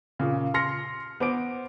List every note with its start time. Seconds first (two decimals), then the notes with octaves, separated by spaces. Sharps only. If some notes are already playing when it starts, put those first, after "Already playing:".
0.19 A#2 C#3
0.54 C6 F6 A#6 C#7
1.20 B3 C5 D6 D7